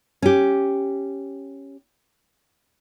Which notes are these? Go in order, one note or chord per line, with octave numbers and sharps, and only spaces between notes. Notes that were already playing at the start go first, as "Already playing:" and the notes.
C#4 G4